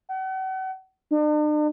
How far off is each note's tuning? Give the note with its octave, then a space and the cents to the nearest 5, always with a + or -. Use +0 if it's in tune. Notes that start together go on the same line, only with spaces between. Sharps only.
F#5 +40
D4 +45